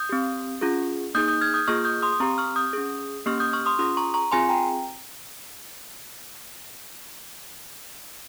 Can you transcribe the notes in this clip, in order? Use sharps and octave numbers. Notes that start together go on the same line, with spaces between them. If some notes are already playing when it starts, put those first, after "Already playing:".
Already playing: D#6 G6
C4 G4
C#4 F4 G#4
A#3 D#4 G#4 D#6 G6
D#6 G6
F6 G#6
D#6 G6
A#3 F4 G#4 C#6 F6
D#6 G6
C6 D#6
D#6
C4 G4 A#5 C#6
C#6 F6
D#6 G6
C#4 G#4
A#3 C#4 G4 C#6 F6
D#6 G6
C#6 F6
C6 D#6
C#4 F4 G#4 C6 D#6
A#5 C#6
A#5 C#6
C4 F4 G#4 G#5 C6
G5 A#5